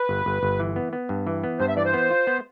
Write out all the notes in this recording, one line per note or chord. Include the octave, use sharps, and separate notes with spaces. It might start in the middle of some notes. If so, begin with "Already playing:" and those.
Already playing: B4
G1
G1
G1
E3
B3
B3
G2
E3
B3
G2 C5
E5
E3 D5
C5
B3
F4
B3